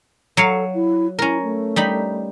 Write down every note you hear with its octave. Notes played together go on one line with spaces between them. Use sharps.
F#3 A4 C#5 F5
E4
C#4 E4 A#4
A3
G3 D#4 B5